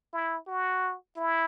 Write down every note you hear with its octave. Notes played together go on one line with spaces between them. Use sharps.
E4
F#4
E4